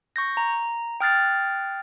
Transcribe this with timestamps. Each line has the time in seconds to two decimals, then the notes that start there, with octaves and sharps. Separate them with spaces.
0.16 C#6 G6 A#6
0.37 A#5
1.00 G5 D#6 F6 F#6 A6 C7